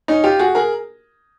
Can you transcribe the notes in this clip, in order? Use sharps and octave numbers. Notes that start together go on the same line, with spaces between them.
C#4 D#4
F4 G4
F#4 G#4
G#4 A#4